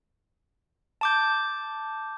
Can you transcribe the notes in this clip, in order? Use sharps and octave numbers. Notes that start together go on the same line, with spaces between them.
A5 D6 G6